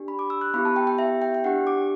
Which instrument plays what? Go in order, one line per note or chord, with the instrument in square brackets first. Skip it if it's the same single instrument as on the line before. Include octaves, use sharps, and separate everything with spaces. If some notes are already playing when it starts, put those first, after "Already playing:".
Already playing: [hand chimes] D4 G4
B5
D6
E6
F#6
B3 E4 G4 B5
A5
G5
G5
E5
G5
G5
D4 G4 F#5
D6